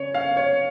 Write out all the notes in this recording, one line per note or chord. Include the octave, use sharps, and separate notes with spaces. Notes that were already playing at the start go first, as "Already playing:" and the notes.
Already playing: C#3 C#5
F5
C#5